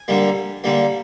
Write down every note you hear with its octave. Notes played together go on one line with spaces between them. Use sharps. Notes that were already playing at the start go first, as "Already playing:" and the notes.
Already playing: G#5
D3 G3 A#3
D3 G3 A#3